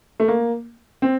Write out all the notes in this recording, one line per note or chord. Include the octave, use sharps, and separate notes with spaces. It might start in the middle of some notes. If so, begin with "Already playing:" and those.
A3
A#3
C4